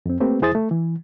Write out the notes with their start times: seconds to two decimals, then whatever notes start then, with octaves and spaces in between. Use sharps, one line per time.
0.06 F2 C4
0.20 A3 A#3 C4 G4 B4
0.42 E2 E4 G#4 C5 D#6 A6
0.55 A3
0.71 E3